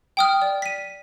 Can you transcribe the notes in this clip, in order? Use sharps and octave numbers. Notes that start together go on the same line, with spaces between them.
G5 D#6 F6
D5
B6 D#7